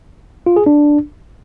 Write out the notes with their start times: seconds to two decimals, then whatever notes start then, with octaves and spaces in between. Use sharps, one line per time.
0.46 F4
0.56 G#4
0.66 D4